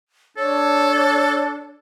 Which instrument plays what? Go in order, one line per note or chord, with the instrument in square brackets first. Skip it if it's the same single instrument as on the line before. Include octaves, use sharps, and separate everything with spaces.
[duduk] D4 [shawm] A4 [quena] C#5